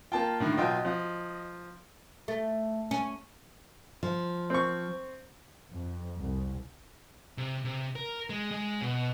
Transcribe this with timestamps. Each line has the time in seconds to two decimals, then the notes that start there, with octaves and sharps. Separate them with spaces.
0.12 A#3 F4 G5 A5
0.40 A2 D3 D#3
0.57 B1 F4 D#5 G5
0.85 F3
2.28 A3
2.91 C#4
4.03 F3
4.50 C4 C#6
5.72 F2
6.18 C2
7.38 C3
7.65 C3
7.96 A#4
8.30 G#3
8.51 G#3
8.81 B2